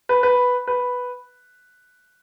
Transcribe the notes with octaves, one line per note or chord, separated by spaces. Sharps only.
B4
B4
B4